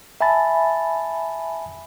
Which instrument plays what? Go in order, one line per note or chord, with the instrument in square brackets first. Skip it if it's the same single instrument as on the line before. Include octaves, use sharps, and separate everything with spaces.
[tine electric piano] E5 G#5 A5 B5 A6